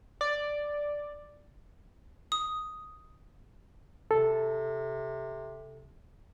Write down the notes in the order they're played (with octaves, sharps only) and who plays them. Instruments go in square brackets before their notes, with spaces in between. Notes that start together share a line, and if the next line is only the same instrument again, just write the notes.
[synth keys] D5
[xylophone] D#6
[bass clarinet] C3 [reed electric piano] A4